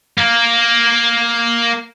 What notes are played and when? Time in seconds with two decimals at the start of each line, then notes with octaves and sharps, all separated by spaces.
0.18 A#3 A#4